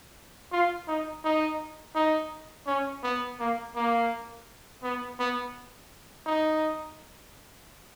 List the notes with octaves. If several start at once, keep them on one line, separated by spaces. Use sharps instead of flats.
F4
D#4
D#4
D#4
C#4
B3
A#3
A#3
B3
B3
D#4